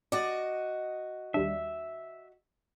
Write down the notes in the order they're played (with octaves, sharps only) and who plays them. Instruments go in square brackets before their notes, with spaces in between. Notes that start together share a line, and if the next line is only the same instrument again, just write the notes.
[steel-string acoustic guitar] F#4 D#5 [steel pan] D5
[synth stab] D#2 G3 D4 [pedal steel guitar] E5